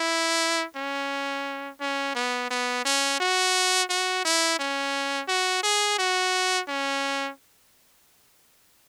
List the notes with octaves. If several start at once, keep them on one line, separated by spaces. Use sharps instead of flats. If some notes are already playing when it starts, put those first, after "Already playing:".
Already playing: E4
C#4
C#4
B3
B3
C#4
F#4
F#4
E4
C#4
F#4
G#4
F#4
C#4